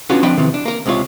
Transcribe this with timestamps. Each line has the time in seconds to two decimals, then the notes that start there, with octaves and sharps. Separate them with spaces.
0.10 B3 C#4 D4 F4 F#4 G#4
0.23 F3 C4 D4 D#5 G5 B5
0.38 F2 C3 D#3 E3
0.54 D4
0.66 A#3 A#4
0.86 C#2 C3 G#3 F4 C#5